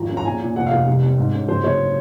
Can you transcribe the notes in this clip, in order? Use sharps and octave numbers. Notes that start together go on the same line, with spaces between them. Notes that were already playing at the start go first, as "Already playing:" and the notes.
Already playing: G#1 F2 A#5
C#4
A#5
A#2 G#5
A#2
F1 F#5
F5
F1
C2
C4
G#2
C#4
F#1 C5
F#1 C#5